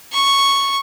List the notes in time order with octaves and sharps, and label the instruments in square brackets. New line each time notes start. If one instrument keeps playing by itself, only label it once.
[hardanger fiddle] C#6